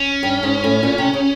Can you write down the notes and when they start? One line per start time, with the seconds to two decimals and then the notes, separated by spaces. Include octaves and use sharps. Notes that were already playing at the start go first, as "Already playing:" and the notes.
Already playing: C#4
0.23 G2
0.43 G#2
0.64 A2
0.83 A#2
0.98 C3
1.13 C#3